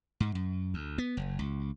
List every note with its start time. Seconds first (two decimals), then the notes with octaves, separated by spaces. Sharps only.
0.20 G#2
0.35 F#2
0.74 D2
0.98 B3
1.17 F#1
1.39 C#2